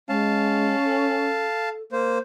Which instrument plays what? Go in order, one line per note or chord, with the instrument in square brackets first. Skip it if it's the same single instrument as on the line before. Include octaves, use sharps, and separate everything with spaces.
[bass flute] G#3 [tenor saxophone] C#4 [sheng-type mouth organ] F5 A5
[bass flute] A4
[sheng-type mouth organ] A#3 C5